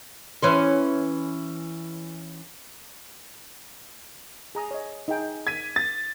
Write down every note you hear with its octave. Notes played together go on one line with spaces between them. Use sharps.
E3 C#4 C5
G#4 A#5 D#6
C#5 D#5
D#4 G#4 G5
G#6 B6 D#7
A6